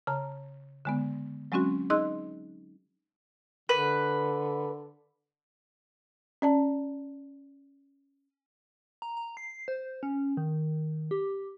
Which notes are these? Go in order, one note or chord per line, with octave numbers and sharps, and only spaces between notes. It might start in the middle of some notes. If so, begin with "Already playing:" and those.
C#3 A5 A#5
D3 G#3 B3
F#3 G#3 C4 C#4 F#4
D#4 G#4 D#5 C6 E6 F#6
D3 B4
C#4 D5 A5
A#5
A#5
C7
C5
C#4
D#3
G4